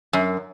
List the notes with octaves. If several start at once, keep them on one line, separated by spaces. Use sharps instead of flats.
F#2